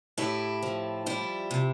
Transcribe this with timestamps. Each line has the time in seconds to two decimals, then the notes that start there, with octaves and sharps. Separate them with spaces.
0.18 A2 E4 G4
0.63 F3
1.06 G3 E4 G4
1.51 C3